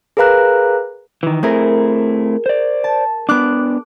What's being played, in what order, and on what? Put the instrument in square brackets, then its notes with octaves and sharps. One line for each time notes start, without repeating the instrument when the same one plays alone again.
[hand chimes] G#4 A#4 B4 F5 A#5 F#6
[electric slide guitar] D#3 E3
[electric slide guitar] A3 C4 E4 [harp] G#4 A#4
[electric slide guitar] C5 D5
[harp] A5
[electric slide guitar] B3 D4 [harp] D6 F#6